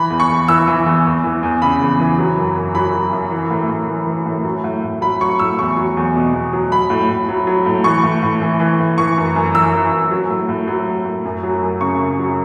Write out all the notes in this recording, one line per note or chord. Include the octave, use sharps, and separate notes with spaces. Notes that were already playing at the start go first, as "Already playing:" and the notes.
Already playing: E3 B5
E2
C#6
E2
E3 E6
E3
E2
E2
E3
E2
C#3 B5
E2
E3
F#3
F#2
F#2
F#3 B5
F#3
F#2
E3
A2
A2
E3
E3
A2
F#3
A2
A2
F#3 B5
F#3 C#6
A2 E6
E2 C#6
F#3
E2
B2
E2
F#3
F#3 B5
A2
A2
F#3
F#3
A2
E3 C#6
A2
A2
E3
E3
A2
E3 C#6
F#2
F#2
E3 E6
E3
F#2
F#3
A2
A2
F#3
F#3
A2
F#2
F#3
F#2
C#3 C#6
F#2
F#3